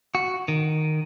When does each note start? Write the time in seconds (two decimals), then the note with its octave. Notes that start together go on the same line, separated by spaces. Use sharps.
0.15 F#4
0.48 D#3